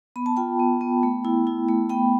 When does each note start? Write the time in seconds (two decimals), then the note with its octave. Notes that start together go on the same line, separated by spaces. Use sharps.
0.16 B3 B5
0.26 A5
0.36 F4 G5 B5
0.59 B3
0.81 B3
1.03 A3
1.25 E4
1.47 E4
1.68 A3
1.90 B3 G5 B5